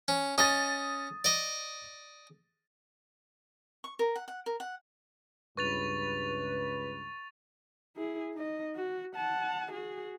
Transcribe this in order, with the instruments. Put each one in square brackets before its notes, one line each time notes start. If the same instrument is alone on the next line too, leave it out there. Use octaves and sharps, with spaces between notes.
[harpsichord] C#4
[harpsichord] C#4 D#5 [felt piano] D#6 A6
[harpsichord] D5 D#5
[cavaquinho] C#6
A#4
F#5
F#5
A#4
F#5
[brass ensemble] C#2 G2 [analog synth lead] B4 [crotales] C#6 A6 F7
[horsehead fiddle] E4 G#4
D#4 D#5
F#4
F#5 A5
F#4 G#4